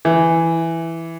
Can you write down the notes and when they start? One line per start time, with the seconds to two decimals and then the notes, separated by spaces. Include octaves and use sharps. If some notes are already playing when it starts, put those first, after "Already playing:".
0.05 E3